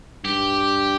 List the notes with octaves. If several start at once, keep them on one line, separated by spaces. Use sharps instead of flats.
G2 G4